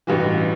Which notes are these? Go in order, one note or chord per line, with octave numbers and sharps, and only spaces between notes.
A1 G2 E3 F#4